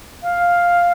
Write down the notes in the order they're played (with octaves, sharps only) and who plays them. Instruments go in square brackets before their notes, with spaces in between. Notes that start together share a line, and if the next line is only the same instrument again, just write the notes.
[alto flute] F5